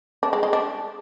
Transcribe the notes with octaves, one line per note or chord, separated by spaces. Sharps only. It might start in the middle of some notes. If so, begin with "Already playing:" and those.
D4
G#3
G#3
D4